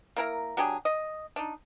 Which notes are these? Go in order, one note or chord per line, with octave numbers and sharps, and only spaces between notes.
A#3 E4 A#4 A#5
F#3 D4 G4 G#4
D#5
D4 D#4